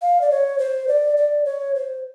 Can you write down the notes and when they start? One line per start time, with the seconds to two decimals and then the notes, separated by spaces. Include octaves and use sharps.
0.02 F5
0.21 D5
0.31 C#5
0.59 C5
0.88 D5
1.17 D5
1.45 C#5
1.75 C5